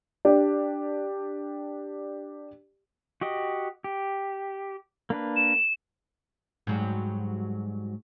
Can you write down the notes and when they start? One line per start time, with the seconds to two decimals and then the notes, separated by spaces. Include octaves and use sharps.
0.25 D4 G4 D5
3.21 F#4 G4 D#5
3.84 G4
5.10 A#3 D4 B4
5.36 E7
6.67 G#2 F#3 G3